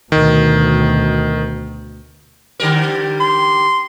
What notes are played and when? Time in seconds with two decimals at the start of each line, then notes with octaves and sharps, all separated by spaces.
0.12 D2 B2 D#3
2.60 D3 G3 A#4
3.21 C6